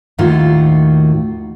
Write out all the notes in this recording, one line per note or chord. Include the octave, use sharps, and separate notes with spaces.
D#2 A2 D#3 F4 F#4